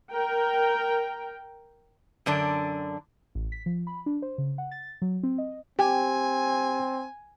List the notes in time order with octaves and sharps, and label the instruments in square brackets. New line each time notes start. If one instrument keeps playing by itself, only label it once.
[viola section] A#4 G5
[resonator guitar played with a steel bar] F#2 D3 D4
[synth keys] A1
B6
F3
B5
D4
C5
C#3
F#5
A6
F#3
C4
D#5
[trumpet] C4 [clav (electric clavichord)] G4 [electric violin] G#5